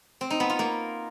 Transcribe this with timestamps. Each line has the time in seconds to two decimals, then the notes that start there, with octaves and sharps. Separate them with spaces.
0.21 C4
0.30 D#4
0.40 B3
0.50 F4
0.59 A#3